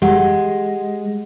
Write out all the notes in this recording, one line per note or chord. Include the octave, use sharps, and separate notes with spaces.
G#3 G4 F#5